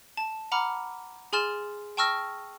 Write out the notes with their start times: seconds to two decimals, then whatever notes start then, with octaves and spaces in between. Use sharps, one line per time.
0.17 A5
0.52 F#5 A#5 B5 D6 F6
1.33 G#4 G#5 C6 F6 A6 E7
1.97 G5 A5 C#6 E6 F6 A#6